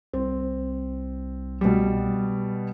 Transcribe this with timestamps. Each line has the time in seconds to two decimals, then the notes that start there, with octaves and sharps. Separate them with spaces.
0.13 C2 C4
1.61 B2 G3